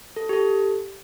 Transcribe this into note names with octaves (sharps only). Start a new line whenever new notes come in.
A4
G4
A4